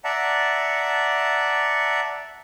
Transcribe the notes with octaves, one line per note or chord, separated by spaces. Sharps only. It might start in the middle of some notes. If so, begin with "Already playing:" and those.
D5 E5 F#5 A5 A#5